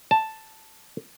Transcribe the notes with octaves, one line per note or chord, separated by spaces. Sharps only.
A5